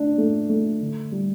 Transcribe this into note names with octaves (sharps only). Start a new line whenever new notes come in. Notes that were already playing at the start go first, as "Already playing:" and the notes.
Already playing: A3 D4
A3
A3
D3
G3